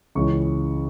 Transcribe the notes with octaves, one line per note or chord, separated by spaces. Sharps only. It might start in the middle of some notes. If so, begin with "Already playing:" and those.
C#2 C#3 E3 C#6